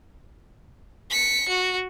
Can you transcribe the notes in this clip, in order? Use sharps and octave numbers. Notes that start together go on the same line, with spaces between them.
B6 C#7
F#4